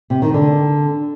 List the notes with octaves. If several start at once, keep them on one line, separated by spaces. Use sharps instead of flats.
C3
D#3
D3